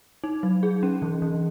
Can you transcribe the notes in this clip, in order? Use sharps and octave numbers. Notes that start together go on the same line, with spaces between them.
D#4
F#3
G#4
C#4
E3
E3